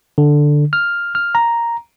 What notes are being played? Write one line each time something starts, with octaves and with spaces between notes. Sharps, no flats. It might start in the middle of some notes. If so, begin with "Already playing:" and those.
D3
F6
F6
A#5